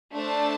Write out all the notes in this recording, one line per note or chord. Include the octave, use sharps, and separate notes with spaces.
A3 D4 C5 A5